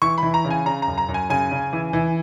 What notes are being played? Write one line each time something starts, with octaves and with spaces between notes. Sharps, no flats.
E3 C#6
B5
E3
A#5
C#3
G#5
C#3 A#5
A#5
F#2
A#5
F#2
G#5
C#3 G#5
C#3
E3
E3